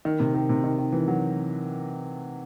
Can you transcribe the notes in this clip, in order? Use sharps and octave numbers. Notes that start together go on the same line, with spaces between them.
D#3
C3
D#3
C3
D#3
D#3
E3
F#3